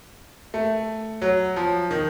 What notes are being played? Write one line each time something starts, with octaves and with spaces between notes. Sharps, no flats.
A3
F#3
F3
D#3